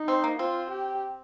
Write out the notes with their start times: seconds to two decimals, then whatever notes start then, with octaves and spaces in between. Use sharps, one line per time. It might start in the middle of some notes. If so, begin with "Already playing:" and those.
Already playing: D#4
0.08 C4
0.24 A#3
0.39 C4 F4
0.71 G4